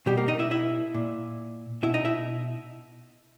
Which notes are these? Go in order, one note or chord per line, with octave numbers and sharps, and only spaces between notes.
B2 G3 G4
A#3 A#4
D#4 D#5
E4 E5
E4 E5
A#2
B2 E4 E5
D#4 D#5
E4 E5